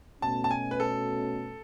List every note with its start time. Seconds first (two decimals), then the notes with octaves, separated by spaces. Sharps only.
0.22 B2 A3 C#4 A5
0.44 A5
0.51 G#5
0.71 B4
0.80 A4